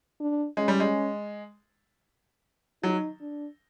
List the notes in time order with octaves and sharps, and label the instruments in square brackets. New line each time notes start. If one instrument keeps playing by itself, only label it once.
[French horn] D4
[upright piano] G#3 [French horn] C#4
[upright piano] G3
G#3
[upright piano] F#3 [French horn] D#4
[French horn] D4